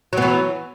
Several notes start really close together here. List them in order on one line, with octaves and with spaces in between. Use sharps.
F#3 B3 E3